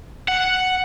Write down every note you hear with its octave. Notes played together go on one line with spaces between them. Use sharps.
F#5